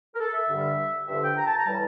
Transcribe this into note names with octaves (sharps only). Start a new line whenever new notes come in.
A#4
A4
E5
G2 D3 G3
G2 D3 F3 E5
G5
A#5
A5
A#5
A2 E3 G3 A5